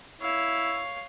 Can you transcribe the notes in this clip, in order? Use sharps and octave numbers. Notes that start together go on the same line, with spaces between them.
E4 C#5 F5